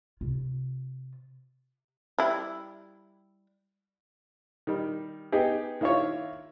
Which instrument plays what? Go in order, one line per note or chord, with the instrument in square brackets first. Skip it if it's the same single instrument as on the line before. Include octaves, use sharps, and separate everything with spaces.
[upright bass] C3 F4
[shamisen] G3 E4
[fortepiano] D#3 G3
B3 D#4 G4 G#4
D#3 A#3 E4 F4 C#5